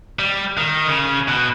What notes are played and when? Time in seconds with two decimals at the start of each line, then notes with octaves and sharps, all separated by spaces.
0.19 G3
0.57 D#3
0.88 C#3
1.28 B2